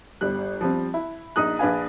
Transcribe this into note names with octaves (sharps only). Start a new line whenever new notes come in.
G1 G3 F#6
F3 G3 C4
E4
A#1 D#4 D#6 F#6
A#1 D4 B4 F5 G#5